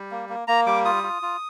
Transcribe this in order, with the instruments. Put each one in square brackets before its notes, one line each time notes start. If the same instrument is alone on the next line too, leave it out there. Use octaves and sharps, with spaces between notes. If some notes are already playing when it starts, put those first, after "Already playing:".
Already playing: [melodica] G3
A#3
A#3
A#3 A#5
G3 D6
F4 D#6
F4
F4